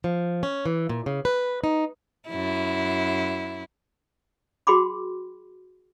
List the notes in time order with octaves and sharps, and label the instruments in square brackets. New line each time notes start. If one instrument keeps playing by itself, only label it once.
[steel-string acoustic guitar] F3
C#4
E3
A#2
C#3
B4
D#4
[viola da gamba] F#2 E4
[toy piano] F#4 G#4 G5 B5 C6 D6